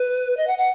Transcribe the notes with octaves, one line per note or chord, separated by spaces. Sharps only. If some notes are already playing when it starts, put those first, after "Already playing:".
Already playing: B4
D#5
F#5
F#5